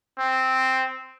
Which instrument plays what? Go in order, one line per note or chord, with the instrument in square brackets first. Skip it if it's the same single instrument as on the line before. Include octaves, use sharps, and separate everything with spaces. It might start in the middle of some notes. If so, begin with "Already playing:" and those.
[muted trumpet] C4